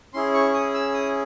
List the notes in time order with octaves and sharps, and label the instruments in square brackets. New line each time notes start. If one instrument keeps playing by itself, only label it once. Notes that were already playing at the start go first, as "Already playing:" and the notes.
[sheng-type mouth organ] C#4 E4 G#4 C6
C#6
D#6
E6
D#6